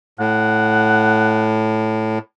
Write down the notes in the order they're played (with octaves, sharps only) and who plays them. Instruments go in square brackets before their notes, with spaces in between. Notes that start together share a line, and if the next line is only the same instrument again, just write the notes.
[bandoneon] A2 [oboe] F#5